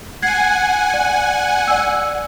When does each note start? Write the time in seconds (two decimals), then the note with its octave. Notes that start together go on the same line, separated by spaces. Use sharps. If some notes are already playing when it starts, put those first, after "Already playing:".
0.22 F#5 G#5 G#6 C7
0.94 D5
1.67 D5 E6